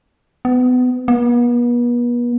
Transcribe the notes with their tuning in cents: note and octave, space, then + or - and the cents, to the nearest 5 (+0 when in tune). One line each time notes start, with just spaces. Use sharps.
B3 +25
B3 -40